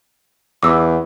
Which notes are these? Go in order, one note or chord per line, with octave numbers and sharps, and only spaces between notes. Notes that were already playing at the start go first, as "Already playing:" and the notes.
E2 D6 E6